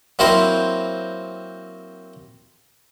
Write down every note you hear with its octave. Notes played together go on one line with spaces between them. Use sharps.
F#3 A#3 C4 E4 A#4 C5